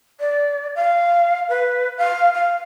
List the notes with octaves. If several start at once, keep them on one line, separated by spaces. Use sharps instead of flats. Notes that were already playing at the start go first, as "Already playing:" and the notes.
D5
F5
B4
F5
F5